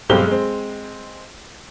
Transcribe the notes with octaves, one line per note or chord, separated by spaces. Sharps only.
B1 G2 G#3 C4 G4 G7
G#3 C4